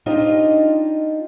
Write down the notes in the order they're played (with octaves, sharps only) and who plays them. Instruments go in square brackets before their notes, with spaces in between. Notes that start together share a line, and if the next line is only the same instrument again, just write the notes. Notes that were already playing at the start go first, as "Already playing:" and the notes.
[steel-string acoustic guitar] D4 D#4 F4 G4 C5 D#5